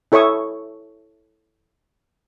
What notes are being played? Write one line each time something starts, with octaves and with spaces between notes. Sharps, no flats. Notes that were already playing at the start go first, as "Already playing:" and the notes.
E4 A4 C#5 E5 C#6 D#6